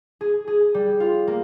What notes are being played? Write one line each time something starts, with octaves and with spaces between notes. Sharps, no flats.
G#4
G#4
G3
F4
A#3